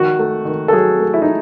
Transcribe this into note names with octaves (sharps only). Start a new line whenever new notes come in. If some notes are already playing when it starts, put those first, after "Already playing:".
Already playing: D#3 F#4
A3
D#3
A4
F#3 G#4
A3
E4
D#4